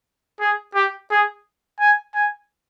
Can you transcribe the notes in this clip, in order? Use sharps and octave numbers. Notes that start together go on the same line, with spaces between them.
G#4
G4
G#4
G#5
G#5